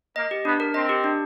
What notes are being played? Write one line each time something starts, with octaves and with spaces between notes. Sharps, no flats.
A#3 D#5
G4
B3 D4
A#4
C4 D#5
G4
D4